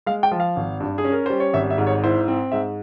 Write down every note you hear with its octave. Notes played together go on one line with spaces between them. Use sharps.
G#3 F5
G5
F3
F5
G#1
G2
G#4
C#4
A#4
G3 C5
C#5
G#1 E5
E5
G#2
C#5
E4 C5
C4
G#2 E5